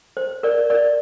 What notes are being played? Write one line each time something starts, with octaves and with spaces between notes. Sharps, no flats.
C5
A#4 D5
A#4 D5